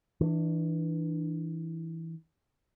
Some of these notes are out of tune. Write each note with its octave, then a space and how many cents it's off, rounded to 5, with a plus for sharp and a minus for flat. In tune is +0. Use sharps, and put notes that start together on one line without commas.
E3 -10 D4 +20